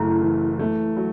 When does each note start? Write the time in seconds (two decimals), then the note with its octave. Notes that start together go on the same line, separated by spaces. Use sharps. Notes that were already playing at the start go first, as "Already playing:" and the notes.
Already playing: F#1 F#2 A3 E4
0.22 E3
0.59 A3
0.97 F#3